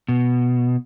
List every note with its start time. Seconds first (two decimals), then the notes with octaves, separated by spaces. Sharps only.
0.09 B2